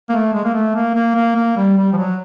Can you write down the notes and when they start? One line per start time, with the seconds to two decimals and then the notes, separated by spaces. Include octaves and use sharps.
0.09 A#3
0.13 A3
0.34 G#3
0.45 A#3
0.54 A3
0.75 A#3
0.95 A#3
1.15 A#3
1.36 A#3
1.57 G3
1.77 G3
1.93 F3
1.97 F#3